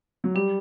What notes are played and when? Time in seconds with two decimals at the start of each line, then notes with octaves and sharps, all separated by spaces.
0.24 F#3
0.35 G3 G4